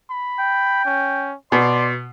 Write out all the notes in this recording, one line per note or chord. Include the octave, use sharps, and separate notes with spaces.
B5
G5
C#4
B2 D5 C6